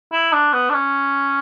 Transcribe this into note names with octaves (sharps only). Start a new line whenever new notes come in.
E4
D4
B3
D4
C#4